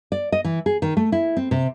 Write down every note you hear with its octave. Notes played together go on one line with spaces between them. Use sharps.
D5
D#5
E3
G#4
D#3
A3
E4
C4
C3